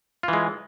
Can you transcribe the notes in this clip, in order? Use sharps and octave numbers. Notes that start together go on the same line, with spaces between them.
E3 G#3 F4